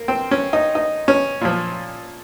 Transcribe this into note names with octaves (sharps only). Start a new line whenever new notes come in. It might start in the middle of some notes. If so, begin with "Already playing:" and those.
Already playing: A#3
C4
C#4
D#4
D#4
C#4
A#2 F3